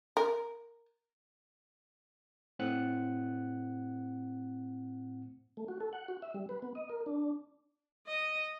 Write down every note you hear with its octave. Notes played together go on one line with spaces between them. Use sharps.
A#4
A2 C4 F#5 F#6
A3
F#4
A4
F#5
F#4
E5
G3
B4
B3
D#5
A#4
D4
D#5